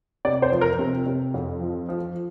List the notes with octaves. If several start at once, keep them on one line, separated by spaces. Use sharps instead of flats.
C3 D5
C5
F3
A#4
C3
C3
F2
F3
F3